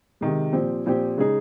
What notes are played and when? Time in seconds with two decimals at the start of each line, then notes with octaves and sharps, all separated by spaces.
0.21 C3 D#3 G#3
0.53 A#2 F3 C4 G4
0.86 A#2 F3 C4 G4
1.18 C#3 G#3 D#4 G#4